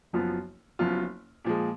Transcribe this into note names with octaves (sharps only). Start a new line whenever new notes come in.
F#1 F#2 F3 B3 F4
F#1 F#2 F3 B3 F4
A#2 F3 G#3